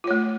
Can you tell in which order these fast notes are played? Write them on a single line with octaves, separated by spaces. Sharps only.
F4 C#5 A3